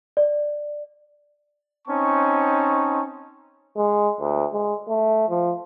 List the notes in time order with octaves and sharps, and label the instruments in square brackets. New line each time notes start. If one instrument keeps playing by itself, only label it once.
[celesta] D5
[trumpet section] C4 C#4 D#4 A5 C#6
[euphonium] G#3
D2
G#3
A3
F3